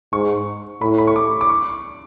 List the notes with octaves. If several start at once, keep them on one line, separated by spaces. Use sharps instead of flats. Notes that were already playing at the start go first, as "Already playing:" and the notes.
G#2 C#6
A2 B5
B5
C#6
D6
D6
C#6